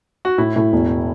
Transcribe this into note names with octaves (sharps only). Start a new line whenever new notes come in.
F#4
A2 E4
A2
E1